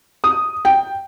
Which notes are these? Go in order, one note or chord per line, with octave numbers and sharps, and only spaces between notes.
D#6
G5